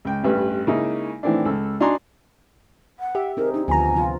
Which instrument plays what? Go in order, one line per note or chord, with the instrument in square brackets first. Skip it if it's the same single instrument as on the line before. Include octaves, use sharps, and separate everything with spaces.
[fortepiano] C#2 G5
A1 G2 B4
C#3 G#3 A#3 D#4 E4
A2 D#3 E3 C4 D4
C#2 A4 E6
D4 D#4 F#4 G#5 A#5 C6
[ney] F#5
[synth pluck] G4 [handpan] E5
[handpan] C4 D#4 G#4 [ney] A#4
[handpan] D4 [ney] D#4
[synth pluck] D2 A#5 [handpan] D#3 F3 B3 [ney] G#5
[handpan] C3 F3 F4